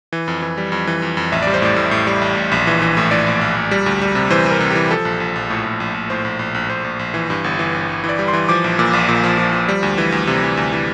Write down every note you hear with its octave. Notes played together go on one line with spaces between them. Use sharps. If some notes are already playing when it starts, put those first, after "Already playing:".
E3
F2
E3
G3
F2
E3
F2
F2
A1 E5
G3 D5
C5
A2 D5
A2
A2
G3
A1
A1
A#1
E3
E3
A2
A2 D5
A#1
A#1
A#1
G3
D2
G3
C3
E3 C5
G3
A#4
C3
E3 G4
F3 A4
A#1
A#1
A#1
A2
A#1
A#1
A#1
A2 C5
A#1
A#1
A#1
A#1 C5
A#1
A#1
E3
G2
G1
E3
G1
G1
E3
D5
G3
C6
E3
F3 D6
A#1
A#2
A#1
A#2
F3
F3
F3
G3
D2
E3
D2
C3
E3
D2
E3